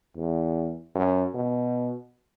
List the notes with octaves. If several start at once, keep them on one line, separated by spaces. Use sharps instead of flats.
E2
F#2
B2